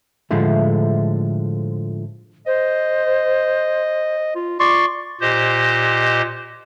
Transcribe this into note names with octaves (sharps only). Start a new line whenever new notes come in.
A2 D3 F3 G#3 A3
C5 D#5
F4
F4 D5 C6 C#6
A#2 G4 C5 D#5